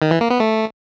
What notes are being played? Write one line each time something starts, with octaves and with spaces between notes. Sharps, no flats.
D#3
E3
A#3
B3
A3